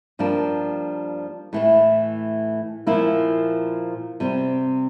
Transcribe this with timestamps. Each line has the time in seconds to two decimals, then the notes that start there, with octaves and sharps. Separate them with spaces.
0.19 G2 F3 A#3 D4
1.53 A2 E3 A3
2.87 A#2 F3 A#3 E4
4.20 C3 G3 C4